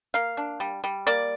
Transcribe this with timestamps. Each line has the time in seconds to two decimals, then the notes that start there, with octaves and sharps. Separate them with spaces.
0.14 A#3 F5
0.37 D4
0.60 G3
0.84 G3
1.07 A#3 D5